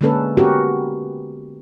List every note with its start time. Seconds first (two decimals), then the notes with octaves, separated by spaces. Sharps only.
0.01 D3 G#3 A#3 C#4 A4 B4
0.37 B3 C#4 F#4 G4 A#4